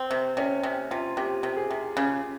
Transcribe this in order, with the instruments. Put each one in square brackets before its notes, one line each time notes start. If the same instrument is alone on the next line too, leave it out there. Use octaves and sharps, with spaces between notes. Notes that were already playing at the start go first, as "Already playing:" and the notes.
Already playing: [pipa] C4
C3
[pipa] C3 [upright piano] C#4
[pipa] C3 [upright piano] C#4
[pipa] C3 [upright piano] F4
[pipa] C3 [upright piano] G4
[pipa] C3
[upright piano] G#4
[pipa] C3
C#3